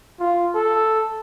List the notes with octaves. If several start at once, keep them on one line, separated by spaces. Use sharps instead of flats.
F4
A4